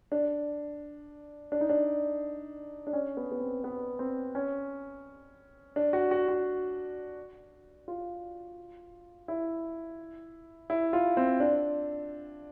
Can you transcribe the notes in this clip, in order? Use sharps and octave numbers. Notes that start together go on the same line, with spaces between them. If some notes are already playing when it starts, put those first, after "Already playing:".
D4
D4
D#4
D4
D4
C#4
B3
B3
C4
B3
C4
C#4
D4
F#4
F#4
F#4
F4
E4
E4
F4
C4
D4